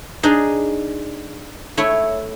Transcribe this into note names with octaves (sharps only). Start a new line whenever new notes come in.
D4 D#4 G#4
A3 E4 C#5